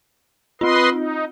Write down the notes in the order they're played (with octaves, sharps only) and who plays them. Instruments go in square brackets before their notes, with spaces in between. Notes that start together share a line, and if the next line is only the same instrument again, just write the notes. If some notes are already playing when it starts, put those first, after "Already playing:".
[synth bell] C4 F4 [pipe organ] B4 D#5 C6
[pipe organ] D#4